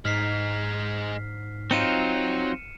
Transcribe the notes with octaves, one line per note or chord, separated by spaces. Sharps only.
G#2 G#3 D#4 F6 B6 C7
F#3 C4 D#4 F4 C#7 D#7 E7